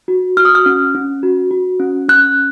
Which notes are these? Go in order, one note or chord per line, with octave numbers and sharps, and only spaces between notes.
F#4
F#4 F6
D#6
F6
C#4
C#4
F#4
F#4
C#4
C#4 F#6